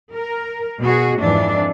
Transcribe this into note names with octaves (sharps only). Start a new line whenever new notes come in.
A#4
B2 F#4 G#4
F2 G#2 E3 D4